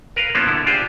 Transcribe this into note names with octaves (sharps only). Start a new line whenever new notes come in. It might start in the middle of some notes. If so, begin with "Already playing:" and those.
A#4 B4 F5
F3 A#3 B3 C#4 E4 F4
D3 E4
D4 F4 G4 G#4 C5